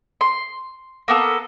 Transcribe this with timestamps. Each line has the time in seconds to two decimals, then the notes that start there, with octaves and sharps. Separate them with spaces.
0.21 C6
1.08 A#3 B3 A4